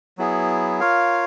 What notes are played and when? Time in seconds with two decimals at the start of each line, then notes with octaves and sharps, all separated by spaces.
0.18 F#3 B3 E4 G#4
0.80 F4 A#4 C#5 F5